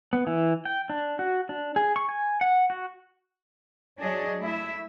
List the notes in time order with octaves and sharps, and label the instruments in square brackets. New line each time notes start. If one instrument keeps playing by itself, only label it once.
[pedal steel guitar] B3
E3
G5
D4
F#4
D4
G#4
C#6
G#5
F#5
F#4
[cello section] F#3 D4 G#4 C#5 D#5
A3 E4 E5